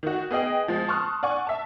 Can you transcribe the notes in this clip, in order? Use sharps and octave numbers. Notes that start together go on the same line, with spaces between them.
D#3 F#4
B3 G#4 D#5 G5
F3 G#3
A5 C6 C#6 D#6 F6 F#6
D5 F#5 G#5 C#6
E5 A5